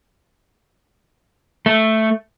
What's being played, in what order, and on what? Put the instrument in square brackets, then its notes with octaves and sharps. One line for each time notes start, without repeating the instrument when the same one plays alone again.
[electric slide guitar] A3